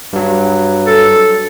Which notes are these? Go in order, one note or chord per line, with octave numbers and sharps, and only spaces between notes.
G2 F#3
A4